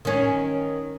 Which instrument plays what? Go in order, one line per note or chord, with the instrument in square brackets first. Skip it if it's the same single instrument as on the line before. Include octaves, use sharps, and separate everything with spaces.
[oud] D#3 C#4